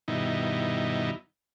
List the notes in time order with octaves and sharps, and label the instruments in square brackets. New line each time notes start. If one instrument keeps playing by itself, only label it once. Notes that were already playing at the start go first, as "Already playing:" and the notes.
[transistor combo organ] G2 B2 D#3 D#4 E4